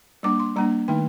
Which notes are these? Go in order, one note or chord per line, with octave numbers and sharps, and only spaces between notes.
G3 A#3 D4 D6
C6
G3 A#3 D4 A#5
D#3 A3 D#4 G5